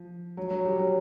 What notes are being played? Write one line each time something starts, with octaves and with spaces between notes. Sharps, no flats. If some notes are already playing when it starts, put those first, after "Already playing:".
Already playing: F3
F#3
F#3
G3
F#3